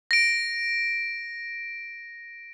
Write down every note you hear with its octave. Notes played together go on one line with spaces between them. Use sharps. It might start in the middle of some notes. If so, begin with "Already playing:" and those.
A#6 D7